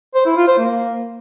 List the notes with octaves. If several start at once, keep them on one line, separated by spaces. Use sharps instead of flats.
C5
E4
F4
C5
A#3